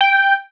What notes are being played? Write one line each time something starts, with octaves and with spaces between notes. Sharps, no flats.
G5